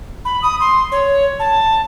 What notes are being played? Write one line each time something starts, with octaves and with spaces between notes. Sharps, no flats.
B5
D#6
C6
C#5
A5